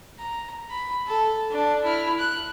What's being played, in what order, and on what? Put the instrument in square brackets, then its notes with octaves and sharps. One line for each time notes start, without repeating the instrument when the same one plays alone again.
[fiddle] A#5
B5
A4
D4
E4 F6
F#6